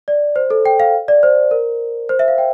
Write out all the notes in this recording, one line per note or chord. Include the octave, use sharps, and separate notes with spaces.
D5
C5
A4
G5
F5
D5
C5
A#4
C5
E5
F5
G5